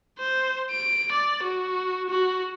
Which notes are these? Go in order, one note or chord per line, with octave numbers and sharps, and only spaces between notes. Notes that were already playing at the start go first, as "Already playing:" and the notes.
C5
D7
D5
F#4
F#4